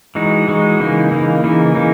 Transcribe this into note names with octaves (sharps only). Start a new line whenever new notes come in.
E3 G#3 D#4 F#4
E3 G#3 D#4 F#4
C#3 E3 A#3 D#4
C#3 E3 A#3 D#4
C#3 E3 A#3 D#4
C#3 E3 A#3 D#4